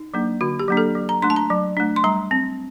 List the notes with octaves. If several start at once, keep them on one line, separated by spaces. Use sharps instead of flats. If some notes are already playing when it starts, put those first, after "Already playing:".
Already playing: D#4
F#3 A#3 D4
D3 F#4
G4
F#3 A#3 D4
A4
F#3
A#5
A3 D4 C6
A5
A#5
F#3
A3 D4
C6
G3 A#5
C4